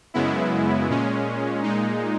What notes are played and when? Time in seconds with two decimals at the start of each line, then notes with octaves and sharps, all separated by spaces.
0.14 F#2 C#3 G#3 B3 E4
0.89 A#2 G#3 C#4
1.63 A#2 G#3 D#4